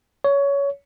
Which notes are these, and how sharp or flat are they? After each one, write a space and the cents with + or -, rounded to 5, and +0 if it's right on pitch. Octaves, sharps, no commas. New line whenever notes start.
C#5 +20